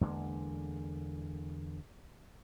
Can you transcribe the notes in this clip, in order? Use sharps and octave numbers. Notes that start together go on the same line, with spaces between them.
E2 D3 G#3 A#3